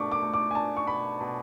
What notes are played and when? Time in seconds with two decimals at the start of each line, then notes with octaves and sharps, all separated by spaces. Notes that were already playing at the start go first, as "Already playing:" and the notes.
Already playing: B2 A3 D4 C#6 D6
0.12 D6
0.22 A3
0.34 D6
0.51 G#5
0.55 D4 A5
0.77 C#6
0.87 B2 B5
1.21 B2